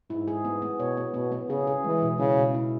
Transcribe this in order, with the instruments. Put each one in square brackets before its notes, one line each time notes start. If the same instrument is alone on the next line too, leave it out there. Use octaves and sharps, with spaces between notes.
[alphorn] G#2 [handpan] E4
[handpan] G#4
B3
B3
[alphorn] B2 [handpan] C#5
[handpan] B3
[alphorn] B2 [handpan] B3
[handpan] B3
[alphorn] C#3 [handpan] G#4
[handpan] G#4
[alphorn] E3 [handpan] G#3
[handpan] B2
[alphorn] C#3 [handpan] E4
[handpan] B2
E4